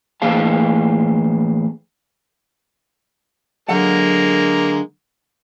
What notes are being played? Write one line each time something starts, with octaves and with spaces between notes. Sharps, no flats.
A2 E3 A#3 G#4 F5 A5
D3 F#3 G#3 A#3 F#5 A#5